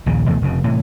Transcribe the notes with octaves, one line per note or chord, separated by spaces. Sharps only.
A#1 D#2 A#2 C#3
D2 B2 E3 A3
F1 F2 C#3
A2 C3 E3